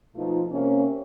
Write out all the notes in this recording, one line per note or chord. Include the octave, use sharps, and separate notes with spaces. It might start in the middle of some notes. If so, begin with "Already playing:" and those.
B2 F3 A3 D#4 F4
C3 A#3 C#4